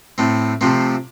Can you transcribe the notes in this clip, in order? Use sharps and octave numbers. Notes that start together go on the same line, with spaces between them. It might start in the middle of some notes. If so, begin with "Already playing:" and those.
A2 A3 C4
C3 F3 A3 C4